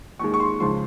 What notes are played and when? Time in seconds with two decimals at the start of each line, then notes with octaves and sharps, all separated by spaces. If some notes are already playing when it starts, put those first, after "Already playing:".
0.19 D#2 D#3 G#3 C#6
0.34 C#6
0.40 C6
0.60 C#2 C#3 F3 G#3 C6